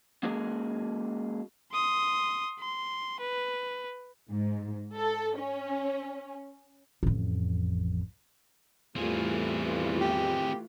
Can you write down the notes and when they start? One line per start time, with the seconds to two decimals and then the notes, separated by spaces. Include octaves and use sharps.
0.23 G#3 A#3 C#4 F#4 G#4 A#4
1.72 C6 D#6
2.60 C6
3.20 B4
4.31 G#2
4.95 A4
5.37 C#4
7.03 A1 F2
8.96 E2 E3 G3 A3 C4 F4 G#4
10.01 G4